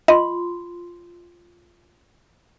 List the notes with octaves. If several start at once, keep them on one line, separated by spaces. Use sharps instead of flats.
F4 D#5 C6